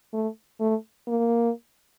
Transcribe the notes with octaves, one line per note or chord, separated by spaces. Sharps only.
A3
A3
A#3